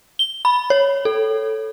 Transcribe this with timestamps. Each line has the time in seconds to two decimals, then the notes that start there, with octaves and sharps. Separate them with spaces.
0.19 G7
0.45 B5
0.70 C#5
1.05 A4